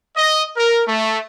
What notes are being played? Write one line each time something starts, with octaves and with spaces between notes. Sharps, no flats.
D#5
A#4
A3